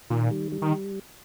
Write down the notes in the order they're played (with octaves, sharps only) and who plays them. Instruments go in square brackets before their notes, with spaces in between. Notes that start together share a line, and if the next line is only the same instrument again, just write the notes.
[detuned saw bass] A#2 [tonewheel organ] D#3
[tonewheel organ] G3
G3
[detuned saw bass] D#3